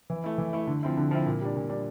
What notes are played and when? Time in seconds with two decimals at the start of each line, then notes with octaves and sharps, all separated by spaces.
0.10 E3
0.24 A3 E4
0.38 E3
0.53 A3 E4
0.67 D3
0.83 F3 C4 E4
0.97 D3
1.11 F3 C4 E4
1.26 A#2
1.41 G3 D4
1.56 A#2
1.69 G3 D4